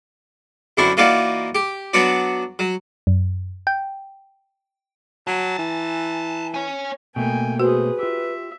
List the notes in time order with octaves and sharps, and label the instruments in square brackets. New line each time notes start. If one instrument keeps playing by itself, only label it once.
[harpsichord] F#2 D3 C4 E4 C#6
E3 A#3 D#4 F4 F#4 D5
G4
F#3 B3 D4 F#4 D5
F#3
[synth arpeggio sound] F#2
G5
[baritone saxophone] F#3 [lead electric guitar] G#5 A5
[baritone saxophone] E3
[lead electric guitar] C#5 G#5
[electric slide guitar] B2 A3 A#3 [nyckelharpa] G5 G#5
[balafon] F#4 [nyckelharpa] G#4 C5 [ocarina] B4
[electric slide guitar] F4 G4 [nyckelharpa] E5